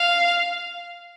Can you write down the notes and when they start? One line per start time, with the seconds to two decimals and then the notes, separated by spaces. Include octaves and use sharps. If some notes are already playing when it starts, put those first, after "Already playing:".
Already playing: F5